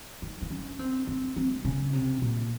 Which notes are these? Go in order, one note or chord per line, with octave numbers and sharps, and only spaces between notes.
D#4
D#4
C#4
C4
C4
C4
C3
C#3
C3
A#2